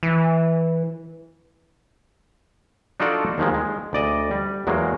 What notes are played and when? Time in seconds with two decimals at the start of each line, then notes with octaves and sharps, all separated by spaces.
0.03 E3
3.00 D4 D#4 F4 F#4 A4 D5
3.38 D#2 D#3 F3 G#3
3.54 G#3
3.93 D2 D5 D#5
4.31 G3
4.67 E2 F#3 G#3 A#3